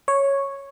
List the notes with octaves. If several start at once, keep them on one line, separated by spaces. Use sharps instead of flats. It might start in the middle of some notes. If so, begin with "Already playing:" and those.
C#5